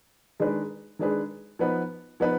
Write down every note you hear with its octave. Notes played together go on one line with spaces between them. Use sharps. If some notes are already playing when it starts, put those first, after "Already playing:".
D#3 G#3 D4 G#4 B4
D#3 G#3 D4 G#4 B4
F3 B3 D#4 B4
F3 B3 D#4 B4